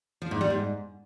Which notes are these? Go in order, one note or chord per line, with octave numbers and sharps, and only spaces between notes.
F3
G#2
G3
G#2